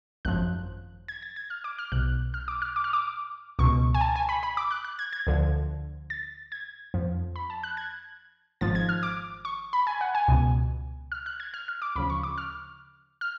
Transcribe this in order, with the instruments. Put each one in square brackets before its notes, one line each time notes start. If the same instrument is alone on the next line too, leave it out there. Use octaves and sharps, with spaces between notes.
[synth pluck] G#1 F#2 F3 F#6
G#6
A6
G#6
F6
D6
F6
B1 B2 F#6
F6
D6
F6
D6
F6
D6
C#2 B2 C#6
G#5
A5
G#5
B5
B5
D6
F#6
F#6
G#6
G#6
D2 D3 F3
A6
G#6
F2 F3
B5
A5
F#6
G#6
G#1 G#2 F3 A6
G#6
F6
D6
C#6
B5
G#5
F#5
G#5
C#2 B2
F6
F#6
G#6
F6
F6
D6
D2 C#3 F3 B5
C#6
D6
F6
F6